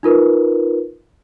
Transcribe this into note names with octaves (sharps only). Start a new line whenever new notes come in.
D#4 F4 A#4 B4